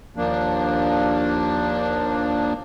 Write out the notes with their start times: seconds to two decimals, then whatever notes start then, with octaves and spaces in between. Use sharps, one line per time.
0.17 D#2 F3 A#3 D4